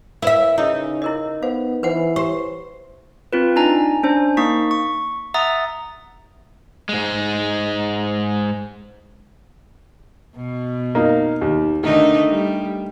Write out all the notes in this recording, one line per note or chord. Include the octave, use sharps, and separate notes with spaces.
E4 A#4 B4 E5
C#3 D#4 E4 D#5 E5
E4 A#4 D#5
B3 C5 F5
E3 B4 C5 F#5
G4 C5
C4 F4 B4
D4 D#4 G#5 A#5
C#4 D4 C5
A#3 D#4 C#6 B6
C#6
E5 F#5 A#5 D#6 A6
G#2 G#3
B2
A#3 D#4
D#2
D3 D#3 A3 D#4
G3